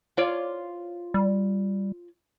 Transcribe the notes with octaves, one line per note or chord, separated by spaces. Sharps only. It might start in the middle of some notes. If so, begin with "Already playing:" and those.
F4 C#5 D5
G3